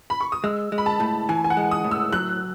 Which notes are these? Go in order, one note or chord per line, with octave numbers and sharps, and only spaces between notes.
B5
C#6
D#6
G#3 E6
G#3
B5
A5
A2
E3 G#5
G#5
F#5
G#3
D#6
A2
E6
F#3 F#6